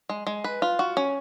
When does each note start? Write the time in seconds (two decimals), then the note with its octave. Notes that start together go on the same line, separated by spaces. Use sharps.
0.09 G#3
0.27 G#3
0.44 B4
0.62 F4
0.79 F#4
0.97 C#4